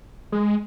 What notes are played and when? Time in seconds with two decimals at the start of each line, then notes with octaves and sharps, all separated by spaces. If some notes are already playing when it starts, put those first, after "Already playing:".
0.32 G#3